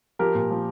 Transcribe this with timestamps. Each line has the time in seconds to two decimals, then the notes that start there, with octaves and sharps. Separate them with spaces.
0.19 F3 G4 A#4
0.35 A#2
0.51 F3